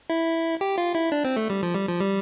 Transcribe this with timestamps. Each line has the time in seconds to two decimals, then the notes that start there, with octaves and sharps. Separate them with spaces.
0.10 E4
0.61 G4
0.78 F4
0.95 E4
1.12 D4
1.24 C4
1.36 A3
1.50 G3
1.63 F3
1.75 G3
1.88 F3
2.00 G3